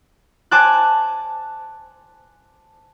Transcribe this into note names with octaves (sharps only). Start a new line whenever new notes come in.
C5 G#5 A5 D6 F#6